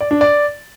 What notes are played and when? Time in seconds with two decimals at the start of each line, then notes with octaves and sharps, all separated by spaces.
0.01 D5
0.11 D4
0.21 D5